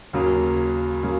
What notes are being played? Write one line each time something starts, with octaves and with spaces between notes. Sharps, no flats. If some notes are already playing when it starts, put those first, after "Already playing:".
D#2 C#3 F#3 A#3
C#3 F#3 A#3